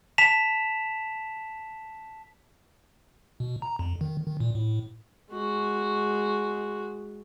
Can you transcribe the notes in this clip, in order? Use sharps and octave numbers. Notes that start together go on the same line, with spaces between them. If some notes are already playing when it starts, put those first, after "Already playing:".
A5 B6 E7 F7
B2
A#5
F2
D#3
D#3
A#2
A2
G#3 F#4